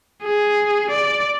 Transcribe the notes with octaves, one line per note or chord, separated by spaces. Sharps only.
G#4
D5